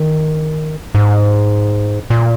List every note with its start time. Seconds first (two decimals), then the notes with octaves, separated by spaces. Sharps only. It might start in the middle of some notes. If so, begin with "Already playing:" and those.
Already playing: D#3
0.95 G#2
2.10 A#2